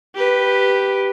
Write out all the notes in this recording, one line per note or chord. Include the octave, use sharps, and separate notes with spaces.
G4 B4